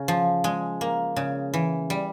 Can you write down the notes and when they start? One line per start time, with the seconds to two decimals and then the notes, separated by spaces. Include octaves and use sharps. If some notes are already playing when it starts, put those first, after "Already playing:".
Already playing: C#3
0.08 F3
0.44 G#3
0.81 A#3
1.16 C#3
1.54 E3
1.90 G3